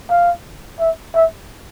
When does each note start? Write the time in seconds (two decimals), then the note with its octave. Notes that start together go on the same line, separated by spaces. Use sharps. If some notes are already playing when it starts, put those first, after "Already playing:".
0.10 F5
0.79 E5
1.15 E5